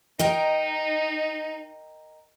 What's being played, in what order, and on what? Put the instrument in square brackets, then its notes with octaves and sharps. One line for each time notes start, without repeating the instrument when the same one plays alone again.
[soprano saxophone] D#4 [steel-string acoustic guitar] A#4 D#5 G5